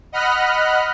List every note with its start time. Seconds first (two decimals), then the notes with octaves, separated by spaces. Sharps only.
0.12 D#5 F#5 B5 F6 F#6